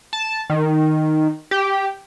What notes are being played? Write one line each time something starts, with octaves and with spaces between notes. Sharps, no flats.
A5
D#3
G4